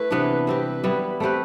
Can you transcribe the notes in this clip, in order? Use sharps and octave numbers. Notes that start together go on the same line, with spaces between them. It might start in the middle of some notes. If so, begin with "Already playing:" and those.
Already playing: A3 E4 B4
C3 E3 B3 D4
G3 C4 G4 B4
G3 B3 E4
A3 C4 G4 B4